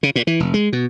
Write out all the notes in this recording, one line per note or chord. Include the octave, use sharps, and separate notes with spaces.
C#3
A#2
E3
F1
G#3
B2